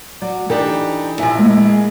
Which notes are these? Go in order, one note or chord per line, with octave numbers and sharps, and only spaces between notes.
F#3 D5
E3 D4 D#4 G4 A4
A#1 E3 E4 F4 G#5
G#3 A#3
G#4